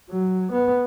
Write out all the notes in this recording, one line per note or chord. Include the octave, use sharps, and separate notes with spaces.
F#3
B3